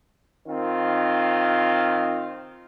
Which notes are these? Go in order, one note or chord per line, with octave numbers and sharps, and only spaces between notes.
D#3 C4 F4